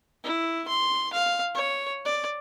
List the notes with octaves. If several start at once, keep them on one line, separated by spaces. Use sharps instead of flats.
E4
C6
F5
C#5
D5